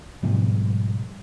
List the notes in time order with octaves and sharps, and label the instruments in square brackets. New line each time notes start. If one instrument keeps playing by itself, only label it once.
[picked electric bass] G#2 B2 F3 G3